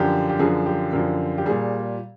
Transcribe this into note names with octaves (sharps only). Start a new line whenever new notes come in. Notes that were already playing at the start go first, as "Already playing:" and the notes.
Already playing: F#2 D3 F3 G4
G4
F#2 D3 F3 G#4
G4
F#2 D3 F3
G4
A#2 G3 G#4